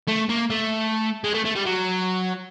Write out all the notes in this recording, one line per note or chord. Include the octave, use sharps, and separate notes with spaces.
A3
A#3
A3
G#3
A3
A3
G3
F#3